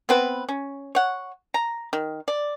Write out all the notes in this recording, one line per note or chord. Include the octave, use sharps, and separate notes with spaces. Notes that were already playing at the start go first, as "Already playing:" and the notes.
B3 C4 B4
C#4
C#5 F#5
A#5
D#3
D5